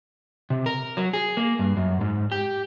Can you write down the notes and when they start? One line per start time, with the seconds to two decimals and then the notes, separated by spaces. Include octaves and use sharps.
0.50 C3
0.66 A#4
0.97 F#3
1.13 G#4
1.37 A#3
1.59 G2
1.77 F#2
2.01 G#2
2.32 G4